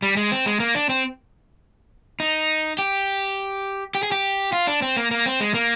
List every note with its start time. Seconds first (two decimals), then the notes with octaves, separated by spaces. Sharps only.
0.02 G3
0.17 G#3
0.32 C4
0.46 G#3
0.60 A#3
0.75 D4
0.89 C4
2.20 D#4
2.79 G4
3.95 G4
4.03 G#4
4.12 G4
4.53 F4
4.67 D4
4.82 C4
4.97 A#3
5.11 A#3
5.26 C4
5.40 G#3
5.54 A#3